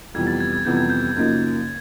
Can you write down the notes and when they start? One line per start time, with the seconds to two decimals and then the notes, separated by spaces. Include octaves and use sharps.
0.14 F2 C3 E3 G3 B3 G#6
0.27 A6
0.40 G#6
0.53 G#6
0.65 F2 C3 E3 G3 B3 G6
0.77 G#6
0.90 G6
1.16 F#2 C#3 F3 A#3 D#4